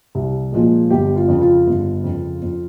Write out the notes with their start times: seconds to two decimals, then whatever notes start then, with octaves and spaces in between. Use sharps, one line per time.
0.15 C2
0.52 A#2 F3 G#3
0.90 G1 G4
1.16 F4
1.28 F2 C#3
1.41 F4
1.67 G1
2.04 F2 C#3
2.42 F2